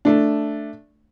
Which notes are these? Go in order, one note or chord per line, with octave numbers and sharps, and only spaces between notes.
A3 D4